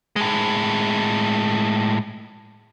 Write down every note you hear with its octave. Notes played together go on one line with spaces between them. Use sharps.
A2 G#3